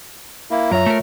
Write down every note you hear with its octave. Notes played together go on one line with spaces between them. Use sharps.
A#3 E4
F#2 F4 C#5 E5 A#5
A3 A#4